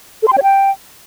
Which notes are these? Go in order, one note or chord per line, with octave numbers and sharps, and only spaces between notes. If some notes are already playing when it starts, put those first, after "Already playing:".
A4
C6
G5
C#5
G5